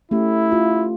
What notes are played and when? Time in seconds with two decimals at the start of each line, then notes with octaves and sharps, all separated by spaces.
0.11 A3 C#4 E4 G4
0.52 F4